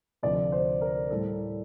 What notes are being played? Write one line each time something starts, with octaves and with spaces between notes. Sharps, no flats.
D2 C3 F3 D5
C5
A#4
A2 G3 A4